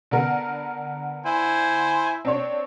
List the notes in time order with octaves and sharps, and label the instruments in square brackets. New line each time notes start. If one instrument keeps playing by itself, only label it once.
[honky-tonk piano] D3 B3 A#4
[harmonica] E4 C5 G#5
[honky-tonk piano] C4 D4 C#5